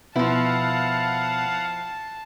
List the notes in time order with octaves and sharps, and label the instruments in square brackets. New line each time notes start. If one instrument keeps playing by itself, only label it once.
[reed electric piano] B2 B3 [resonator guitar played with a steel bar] F3 E4 [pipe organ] F5 F#5 [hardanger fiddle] A5